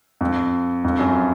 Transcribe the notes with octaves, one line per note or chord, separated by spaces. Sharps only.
F2
F2
F#2